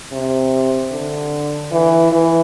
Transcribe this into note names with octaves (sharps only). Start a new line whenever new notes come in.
C3
D3
E3
E3